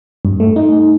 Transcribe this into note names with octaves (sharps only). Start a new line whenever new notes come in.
G2
A3
D#4